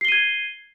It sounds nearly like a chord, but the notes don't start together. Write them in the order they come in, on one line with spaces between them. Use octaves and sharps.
C7 G7 D#7 G#6